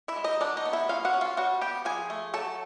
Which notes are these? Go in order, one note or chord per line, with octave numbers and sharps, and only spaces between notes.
E4 E5
G#3
D#4 D#5
F#3 D4 D5
D#4 D#5
B3
E4 E5
C#4 F4 F5
F#4 F#5
C#4
F4 F5
G3 F#4 F#5
B3 G4 G5
F3 G#4 G#5
A3
F#3 A4 A5